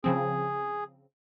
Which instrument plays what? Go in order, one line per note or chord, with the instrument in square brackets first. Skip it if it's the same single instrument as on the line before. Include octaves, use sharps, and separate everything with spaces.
[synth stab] C#3 F3 C4 [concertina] G#4